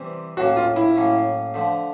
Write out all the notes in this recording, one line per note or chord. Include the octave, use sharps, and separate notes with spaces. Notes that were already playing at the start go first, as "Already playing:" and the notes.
Already playing: C3 E3 G3 C4
A2 F#3 A#3 C#4 F#4
F4
E4
A2 F#3 A#3 C#4
D3 F3 A3